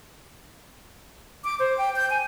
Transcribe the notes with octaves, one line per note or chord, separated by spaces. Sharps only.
D6
C5
G5
G6
G#5